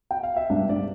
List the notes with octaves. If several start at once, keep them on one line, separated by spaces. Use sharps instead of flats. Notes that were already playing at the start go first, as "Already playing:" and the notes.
G5
F5
E5
G2 D4 D5
G2 D4 D5